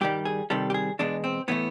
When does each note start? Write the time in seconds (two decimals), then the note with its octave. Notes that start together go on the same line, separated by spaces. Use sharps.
0.01 G2 D#3 G3 G4
0.25 G#4
0.50 C3 D#3 G3 A4
0.70 G4
0.74 G#4
0.99 E2 B2 G#3 D4
1.24 C4
1.48 A2 E3 A3 B3